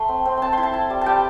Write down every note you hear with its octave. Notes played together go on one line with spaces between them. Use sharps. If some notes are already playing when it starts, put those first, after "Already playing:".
Already playing: A3 C6
C4
C4
C4 A5 C6
E4 C6
A5
E4
G3
G3 G5 A5